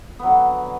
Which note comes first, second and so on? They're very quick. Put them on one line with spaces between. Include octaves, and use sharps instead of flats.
B3 F#3 D3